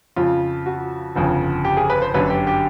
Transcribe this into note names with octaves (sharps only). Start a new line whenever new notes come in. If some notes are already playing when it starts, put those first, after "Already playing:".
F2 C#3 F3 F4
F#4
G1 F2 C#3
G4
G#4
B4
C5
G1 F#2 D3 F#3 B4
G4
G4